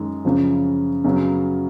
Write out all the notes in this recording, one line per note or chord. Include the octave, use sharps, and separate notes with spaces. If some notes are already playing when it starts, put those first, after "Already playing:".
Already playing: F#2 D#3 G#3
F#2 C#3 F3
F#2 C#3 F#3 B3